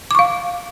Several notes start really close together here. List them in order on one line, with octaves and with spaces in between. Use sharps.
D6 C#6 F5